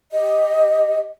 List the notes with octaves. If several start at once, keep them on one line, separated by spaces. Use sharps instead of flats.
G4 D#5